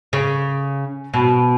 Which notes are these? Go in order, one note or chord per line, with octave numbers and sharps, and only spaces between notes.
C#3
B2